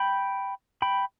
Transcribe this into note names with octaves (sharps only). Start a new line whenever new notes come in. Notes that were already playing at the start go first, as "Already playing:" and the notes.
Already playing: G5 B5
G5 B5